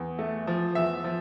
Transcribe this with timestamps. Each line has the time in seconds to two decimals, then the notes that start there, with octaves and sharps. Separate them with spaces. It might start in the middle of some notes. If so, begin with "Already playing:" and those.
Already playing: E2
0.19 A3
0.47 F3
0.75 E2 E5
1.04 F3